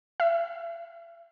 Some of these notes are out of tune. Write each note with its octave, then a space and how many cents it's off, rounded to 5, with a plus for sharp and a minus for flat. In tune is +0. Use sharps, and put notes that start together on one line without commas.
E5 +40